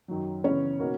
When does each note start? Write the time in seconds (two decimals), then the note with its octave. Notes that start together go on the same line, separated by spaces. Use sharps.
0.08 F#2 D#3 F#3
0.44 C#3 E3 B3 C#4 C#5
0.79 B2 A#3 D#4 F#4 A#4